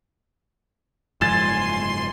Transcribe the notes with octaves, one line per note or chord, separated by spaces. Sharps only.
F#1 G#2 F3 G#5 C6 A6 E7